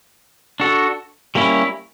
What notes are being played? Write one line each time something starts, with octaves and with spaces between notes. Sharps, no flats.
D4 F#4 A4
G3 A#3 C#4 E4